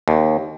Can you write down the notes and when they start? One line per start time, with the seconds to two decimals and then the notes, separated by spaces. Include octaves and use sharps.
0.08 D#2